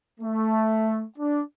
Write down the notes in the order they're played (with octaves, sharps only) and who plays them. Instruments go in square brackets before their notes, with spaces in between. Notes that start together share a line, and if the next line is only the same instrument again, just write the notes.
[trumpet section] A3
D4